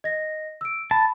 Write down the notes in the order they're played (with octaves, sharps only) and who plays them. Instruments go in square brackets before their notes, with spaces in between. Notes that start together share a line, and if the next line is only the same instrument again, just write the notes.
[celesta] D#5 A#6
E6 D7
[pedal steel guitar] A5 [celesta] B5